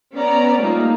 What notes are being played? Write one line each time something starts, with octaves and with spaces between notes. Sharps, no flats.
B3 C#4 D5 A#5
G3 A3 A#3 D#4 F4